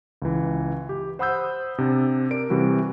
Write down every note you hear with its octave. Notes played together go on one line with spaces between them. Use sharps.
C#2 E3
G4
C5 F#5 B5 D#6 E6 G6
C3 D4
A#4 D5 D7
C3 E3 G3 F#4